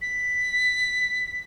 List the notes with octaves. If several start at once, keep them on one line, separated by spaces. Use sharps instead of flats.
B6